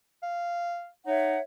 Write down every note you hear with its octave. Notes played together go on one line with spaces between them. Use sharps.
F5
D#4 C#5 E5 F#5